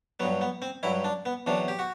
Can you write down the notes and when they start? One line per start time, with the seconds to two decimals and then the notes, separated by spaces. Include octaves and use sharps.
0.20 G2 F#3 B3
0.41 B3
0.62 C4
0.83 G2 F#3 E4
1.04 D4
1.26 B3
1.47 E2 C3 F#3 D4
1.68 G4
1.79 F#4